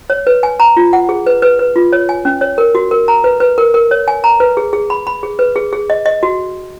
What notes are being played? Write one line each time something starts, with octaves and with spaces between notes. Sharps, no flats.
C#5
B4
G#5
A#5
F4
F#5
G#4
B4
B4
B4
F4
C#5
G#5
C#4
C#5
A#4
F#4
A#4
A#5
B4
B4
A#4
A#4
C#5
G#5
A#5
B4
G#4
G#4
B5
B5
G#4
B4
G#4
G#4
D#5
D#5
F#4